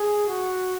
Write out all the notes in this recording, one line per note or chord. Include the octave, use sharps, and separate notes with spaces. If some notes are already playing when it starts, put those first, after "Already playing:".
Already playing: G#4
F#4